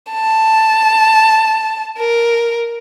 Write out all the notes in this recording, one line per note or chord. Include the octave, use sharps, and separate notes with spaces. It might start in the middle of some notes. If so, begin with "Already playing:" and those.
A5
A#4